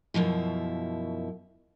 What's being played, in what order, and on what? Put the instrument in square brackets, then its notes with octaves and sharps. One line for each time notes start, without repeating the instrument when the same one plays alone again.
[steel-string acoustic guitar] F#2 B2 F3 E4